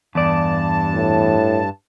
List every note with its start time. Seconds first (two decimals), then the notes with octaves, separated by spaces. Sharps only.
0.15 E2 G2 D5 A5
0.95 A2